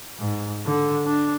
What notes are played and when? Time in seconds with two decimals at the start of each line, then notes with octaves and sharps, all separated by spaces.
0.19 G#2
0.66 D3
1.07 D4